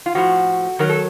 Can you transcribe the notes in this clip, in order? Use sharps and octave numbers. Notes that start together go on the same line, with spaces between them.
F4
A2 F3 F#4
F#2 D#3 F#3 A#4
A4